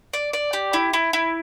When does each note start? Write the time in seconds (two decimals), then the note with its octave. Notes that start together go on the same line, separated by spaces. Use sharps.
0.13 D5
0.33 D5
0.53 G4
0.73 E4
0.93 E4
1.13 E4